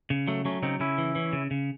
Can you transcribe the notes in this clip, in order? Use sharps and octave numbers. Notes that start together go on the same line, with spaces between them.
C#3
F#3 A3
F#3 A3 C#4
C#3 C4 D#4
C#3 C#4 E4
E3
E3
C#3
C#3